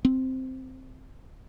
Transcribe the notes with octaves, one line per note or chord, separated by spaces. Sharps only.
C4